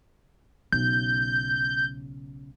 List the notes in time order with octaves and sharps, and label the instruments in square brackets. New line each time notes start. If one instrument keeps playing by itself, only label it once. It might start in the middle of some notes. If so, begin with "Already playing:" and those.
[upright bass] B1 C#3 [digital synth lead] G6